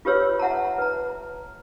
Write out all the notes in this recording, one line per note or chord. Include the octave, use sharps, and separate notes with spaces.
F4 G4 B4 C#5 E6
E5 F#5 A5 A#5
B4 A#5